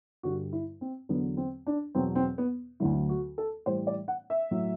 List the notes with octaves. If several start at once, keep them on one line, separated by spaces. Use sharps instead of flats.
G2 D3 G3 F#4
E4
C4
E2 D3 F#3 B3
C4
D4
E2 B2 F#3 C4
C4
B3
D2 D3 F#3 E4
F#4
A4
A2 E3 G3 C5
D5
F#5
E5
A2 F#3